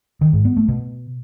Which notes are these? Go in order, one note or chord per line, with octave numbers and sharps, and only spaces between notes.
D#3
G#2
B3
A3
B2